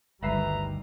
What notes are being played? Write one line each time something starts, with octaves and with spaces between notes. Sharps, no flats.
G1 D2 D#3 G3 B4 E5 A#5 C7